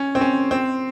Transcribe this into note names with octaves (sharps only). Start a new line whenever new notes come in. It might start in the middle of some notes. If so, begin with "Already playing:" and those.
Already playing: C#4
C4
C#4
C4